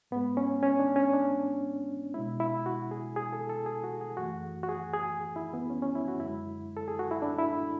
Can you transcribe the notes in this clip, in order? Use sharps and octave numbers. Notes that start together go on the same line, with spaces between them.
G#2 G#3 B3
C#4
C#4
D4
C#4
D4
B2 G#3 E4
E4
F#4
G#4
G#4
A4
A4
G#4
F#4
G#4
F#2 E3 A3 F#4
F#4
G#4
G#4
E4
B3
C#4
C#4
E4
F#4
F#2 D3 G#3 E4
A4
G#4
F#4
E4
D4
E4